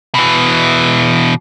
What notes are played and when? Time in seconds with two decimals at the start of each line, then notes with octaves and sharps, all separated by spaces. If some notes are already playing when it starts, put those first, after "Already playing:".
0.15 B2 E3